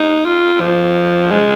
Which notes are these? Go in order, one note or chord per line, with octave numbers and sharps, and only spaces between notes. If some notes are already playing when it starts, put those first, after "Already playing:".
Already playing: D#4
F4
F3
G#3